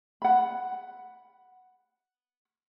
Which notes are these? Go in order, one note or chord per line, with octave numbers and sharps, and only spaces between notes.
F#5 B5